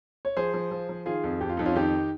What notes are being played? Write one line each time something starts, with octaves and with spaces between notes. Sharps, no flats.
C#5
F3 G#4 C5
F3
F3
F3
D#3 F4 G#4
F2
F2 G4
F4
F2 D#4
C#4 F4
D#3 D#4 G4